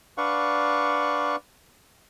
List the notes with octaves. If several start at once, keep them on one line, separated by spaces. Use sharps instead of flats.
D4 B4 D5 F5 F#5 C#6